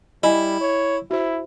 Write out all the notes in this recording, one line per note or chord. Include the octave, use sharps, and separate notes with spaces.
G3 E4 D#5 G#5
C#5
E4 F#4 C5